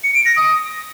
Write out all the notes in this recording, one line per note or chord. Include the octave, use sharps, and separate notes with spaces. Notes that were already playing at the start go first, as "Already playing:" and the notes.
C#7
D7
A#6
D#6